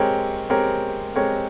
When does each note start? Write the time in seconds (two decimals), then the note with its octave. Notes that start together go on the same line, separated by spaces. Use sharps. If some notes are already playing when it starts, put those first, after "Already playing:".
Already playing: G#3 C4 G4 A#4 C#5
0.50 G#3 C4 G4 A#4 C#5
1.16 G#3 C4 G4 A#4 C#5